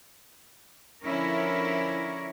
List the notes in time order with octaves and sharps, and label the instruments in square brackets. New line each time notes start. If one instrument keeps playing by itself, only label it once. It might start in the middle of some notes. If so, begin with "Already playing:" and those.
[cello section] D3 F3 C#4 E4 A#4 C#5